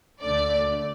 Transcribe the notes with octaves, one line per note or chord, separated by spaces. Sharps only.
D2 D3 A3 D5